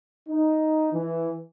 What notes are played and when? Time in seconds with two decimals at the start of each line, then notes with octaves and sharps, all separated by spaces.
0.29 D#4
0.93 E3